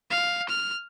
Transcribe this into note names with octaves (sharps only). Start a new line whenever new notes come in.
F5
F6